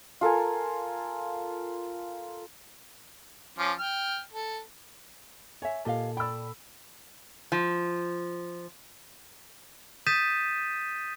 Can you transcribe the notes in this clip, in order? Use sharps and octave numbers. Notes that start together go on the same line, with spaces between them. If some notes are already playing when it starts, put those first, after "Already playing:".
F4 A4 A#4 G#5
F3 C#4 D6
G5 F6
A4
C#5 E5 G#5
A#2 G4 A4 D#5 F5 A5
D5 G5 B5 E6
F3
D#6 G6 A6 B6 D#7 E7